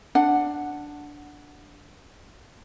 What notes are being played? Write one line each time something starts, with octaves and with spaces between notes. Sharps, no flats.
D4 F#5